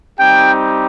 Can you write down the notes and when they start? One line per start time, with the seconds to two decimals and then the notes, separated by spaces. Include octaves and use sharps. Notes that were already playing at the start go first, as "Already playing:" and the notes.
0.19 G3 C4 D#4 G4 G5